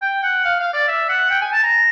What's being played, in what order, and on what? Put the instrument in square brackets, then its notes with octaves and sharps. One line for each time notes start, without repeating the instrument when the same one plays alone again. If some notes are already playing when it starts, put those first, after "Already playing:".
[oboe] G5
F#5
F5
F5
D5
E5
F#5
G5
G#5
A5
A#5